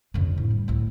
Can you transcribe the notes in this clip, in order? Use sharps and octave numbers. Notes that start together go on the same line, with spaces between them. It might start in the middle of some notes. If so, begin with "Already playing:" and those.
F2 D3
A2
G3
D2 A2